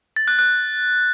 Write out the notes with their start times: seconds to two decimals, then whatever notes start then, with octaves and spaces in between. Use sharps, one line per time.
0.16 A6
0.28 F#6
0.39 F#6